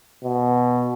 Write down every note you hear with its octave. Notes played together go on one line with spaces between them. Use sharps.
B2